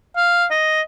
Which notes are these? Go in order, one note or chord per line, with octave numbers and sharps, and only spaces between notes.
F5
D#5